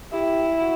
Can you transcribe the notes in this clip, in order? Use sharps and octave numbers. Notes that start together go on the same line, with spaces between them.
E4 G4
F#4